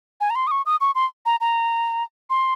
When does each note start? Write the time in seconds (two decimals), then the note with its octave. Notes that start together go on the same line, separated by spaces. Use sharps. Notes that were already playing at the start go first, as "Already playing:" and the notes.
0.21 G#5
0.30 A#5
0.35 C6
0.47 D#6
0.51 C#6
0.66 D#6
0.81 C#6
0.95 C6
1.26 A#5
1.41 A#5
2.30 C6